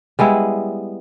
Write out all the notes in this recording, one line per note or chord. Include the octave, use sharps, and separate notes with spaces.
G3 G#3 B3 E4